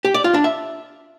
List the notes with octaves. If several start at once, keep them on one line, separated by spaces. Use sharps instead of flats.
G4
D5
F4
D4
E5